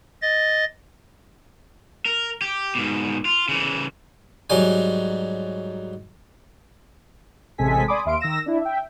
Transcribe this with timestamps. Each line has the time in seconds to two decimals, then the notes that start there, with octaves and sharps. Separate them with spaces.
0.22 D#5 A6
2.06 A#4
2.41 G4
2.75 G#2 B2
3.25 F4
3.49 C#3 E3
4.50 G#2 F#3 G3 G#5
7.58 A1 C3 G#3 A4 G#5 B6
7.88 D5 G#5 B5 C6 D6 D#6
8.06 D#2 E5 F5 C6 D7
8.20 D#3 E6 A#6 E7
8.46 D4 E4
8.61 E5 G5